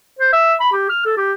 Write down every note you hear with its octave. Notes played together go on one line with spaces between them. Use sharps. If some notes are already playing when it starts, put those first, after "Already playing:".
C5
E5
B5
G4
F6
A4
G4